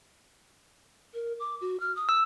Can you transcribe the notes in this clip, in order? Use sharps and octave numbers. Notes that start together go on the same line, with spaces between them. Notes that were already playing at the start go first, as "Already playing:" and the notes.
A#4
D6
F#4
F6
D#6
E6